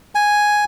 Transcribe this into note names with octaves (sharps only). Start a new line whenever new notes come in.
G#5